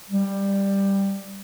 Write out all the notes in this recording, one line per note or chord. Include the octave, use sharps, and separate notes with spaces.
G3